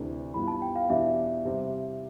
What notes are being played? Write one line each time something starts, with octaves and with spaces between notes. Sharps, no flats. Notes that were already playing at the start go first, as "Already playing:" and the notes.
Already playing: D2 C3 E3 A3 D4
G2 E3 G3 B3 F4 B5
A5
G5
F5
E2 B2 B3 D4 G4 E5
C3 G3 C4